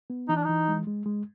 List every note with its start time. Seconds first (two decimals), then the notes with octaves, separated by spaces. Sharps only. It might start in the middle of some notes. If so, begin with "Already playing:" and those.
0.10 B3
0.29 E3 D#4
0.36 D4
0.44 E3 D#4
0.68 G#3
0.87 G#3
1.06 G#3